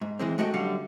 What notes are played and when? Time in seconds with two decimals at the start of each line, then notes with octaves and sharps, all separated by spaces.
0.01 G#2
0.19 G#2 E3 G#3 C4
0.38 G#3 A3 F#4 D#5 F5 G5
0.54 F#2 D3 G3 F5 F#5